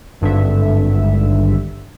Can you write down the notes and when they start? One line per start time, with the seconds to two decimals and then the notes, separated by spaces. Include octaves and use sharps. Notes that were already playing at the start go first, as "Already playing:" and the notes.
0.21 G#1 G2 D3 E5